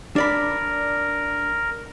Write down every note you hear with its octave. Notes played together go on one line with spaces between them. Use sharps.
D4 A#4 D5 B5